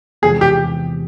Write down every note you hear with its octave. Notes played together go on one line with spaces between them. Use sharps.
E2 C3 F3 G#3 G#4
G4